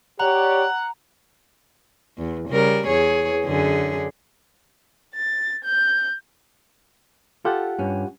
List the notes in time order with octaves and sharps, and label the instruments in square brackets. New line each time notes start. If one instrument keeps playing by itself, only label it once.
[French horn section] G4 C#5 D5 [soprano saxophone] F#5 [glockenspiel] A#5
[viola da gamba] E2
C#3 G3 A#4
E2 G#4 C#5
F#2 D3 G#4
[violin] A6
G6
[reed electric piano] F4 G4 F#5 [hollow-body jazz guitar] A4
[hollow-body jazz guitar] G2 C#4